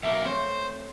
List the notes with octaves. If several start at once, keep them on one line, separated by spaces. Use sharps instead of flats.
B1 A#3 E5
A3 C4 C5 C#5